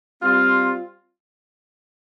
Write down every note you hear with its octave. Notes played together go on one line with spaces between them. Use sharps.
G3 C4 F4